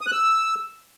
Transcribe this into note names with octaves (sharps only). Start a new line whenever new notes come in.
D#6
F#6
E6